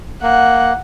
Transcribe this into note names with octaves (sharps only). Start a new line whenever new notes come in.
A#3 F#5